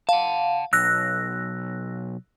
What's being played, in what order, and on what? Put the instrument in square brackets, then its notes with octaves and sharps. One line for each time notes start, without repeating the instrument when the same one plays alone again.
[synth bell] F5 [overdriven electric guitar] F#5 A5
[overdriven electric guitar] B1 [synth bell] E6 F#6 A#6